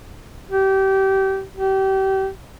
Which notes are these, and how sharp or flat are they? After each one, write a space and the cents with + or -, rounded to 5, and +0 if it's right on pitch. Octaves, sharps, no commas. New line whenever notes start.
G4 -25
G4 -30